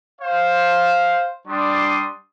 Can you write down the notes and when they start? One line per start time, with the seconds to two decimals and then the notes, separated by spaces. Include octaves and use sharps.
0.21 C5 F5
1.46 G3 D4 D5 C6 D#6